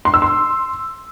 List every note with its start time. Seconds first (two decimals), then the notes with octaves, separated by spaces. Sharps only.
0.05 C6
0.14 E6
0.22 C6